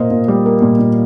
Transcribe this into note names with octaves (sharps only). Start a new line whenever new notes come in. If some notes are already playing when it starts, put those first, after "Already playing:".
Already playing: A#2 A#3 C5 D#5
A#2
G3
A#3
A#2
A#2